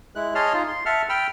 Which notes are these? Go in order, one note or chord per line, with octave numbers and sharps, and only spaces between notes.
G#3 E4 F#6
G#4 C#5 D#5 A5 C6 F6
D#4 F4
C6
E5 F#5 A5 F6
G5 B5 E6 F6